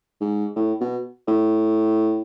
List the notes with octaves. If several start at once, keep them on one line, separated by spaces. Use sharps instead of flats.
G#2
A2
B2
A2